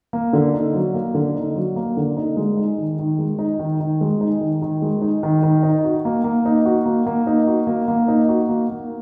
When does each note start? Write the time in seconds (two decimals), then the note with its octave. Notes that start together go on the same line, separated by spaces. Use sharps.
0.13 A#3
0.33 D3
0.54 D#4
0.74 F#3
0.94 A#3
1.15 D3
1.36 D#4
1.56 F#3
1.76 A#3
1.97 D3
2.17 D#4
2.37 G#3
2.57 D#4
2.78 D#3
2.99 D#3
3.19 G#3
3.39 D#4
3.59 D#3
3.80 D#3
4.01 G#3
4.21 D#4
4.41 D#3
4.62 D#3
4.82 G#3
5.02 D#4
5.23 D#3
5.43 D#3
5.63 D#4
5.84 F#4
6.05 A#3
6.24 A#3
6.45 D#4
6.65 F#4
6.86 A#3
7.06 A#3
7.27 D#4
7.47 F#4
7.67 A#3
7.88 A#3
8.08 D#4
8.29 F#4
8.49 A#3
8.70 A#3